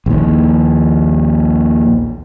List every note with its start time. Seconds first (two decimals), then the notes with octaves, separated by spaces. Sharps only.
0.06 A#1 D#2